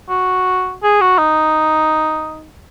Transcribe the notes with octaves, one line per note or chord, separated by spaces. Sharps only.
F#4
G#4
F#4
D#4